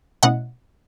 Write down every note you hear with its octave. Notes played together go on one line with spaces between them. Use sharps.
B2 A3 C#4 E4 D#5 F#5